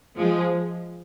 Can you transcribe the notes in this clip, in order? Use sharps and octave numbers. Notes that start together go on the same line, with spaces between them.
F3 G#3